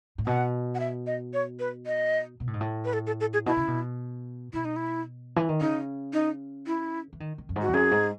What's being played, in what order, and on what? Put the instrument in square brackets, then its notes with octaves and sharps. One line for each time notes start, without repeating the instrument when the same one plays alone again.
[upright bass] A2
[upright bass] B2 [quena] F#5
[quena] F#5
E5
D#5
C#5
B4
D#5
[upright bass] B2
A2
G#2
A2
[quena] B4
A4
A4
A4
G#4
[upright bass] B2 [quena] E4
[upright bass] C#3
B2
[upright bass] B2 [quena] E4
[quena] D#4
E4
[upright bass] E3
D#3
[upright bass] C#3 [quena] D#4
[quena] D#4
E4
[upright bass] E3
D#3
D#3
F#2
G#2
[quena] F#4
[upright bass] E2
[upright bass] F#2 [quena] G#4
[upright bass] G#2